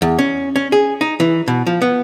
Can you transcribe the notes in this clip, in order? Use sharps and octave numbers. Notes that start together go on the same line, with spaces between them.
E2
C#4
C#4
G#4
D#4
E3
B2
F3
B3